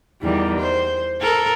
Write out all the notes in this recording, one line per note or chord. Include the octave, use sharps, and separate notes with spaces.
E2 D#3 G3
C5
A4 A#4